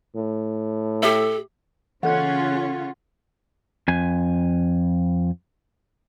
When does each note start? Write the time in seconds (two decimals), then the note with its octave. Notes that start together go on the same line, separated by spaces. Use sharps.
0.16 A2
1.03 G4 A4 E5
2.03 C#3 E3 C#4 F4 A4 F#5 F#6
3.88 F2 G#5